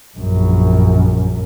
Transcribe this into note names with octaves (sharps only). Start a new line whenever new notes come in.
A#1 F#2